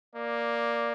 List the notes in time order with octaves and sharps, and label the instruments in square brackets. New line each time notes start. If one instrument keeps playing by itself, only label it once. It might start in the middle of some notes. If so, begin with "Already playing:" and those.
[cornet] A#3 [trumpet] D5